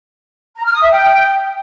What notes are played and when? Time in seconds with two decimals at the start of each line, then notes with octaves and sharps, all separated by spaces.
0.56 A#5
0.65 F6
0.73 D#6
0.82 E5
0.91 G5